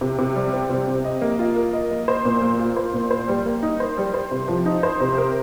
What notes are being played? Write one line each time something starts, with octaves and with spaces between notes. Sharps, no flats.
C3
C3
G3
C4
C3
C3
D#5
A#3
F4
A#4
D#5
A#3
C5
A#2
A#3
F4
C5
A#2
C5
G3
A#3
D#4
C5
G3
C5
C3
F3
D#4
C5
C3
A#4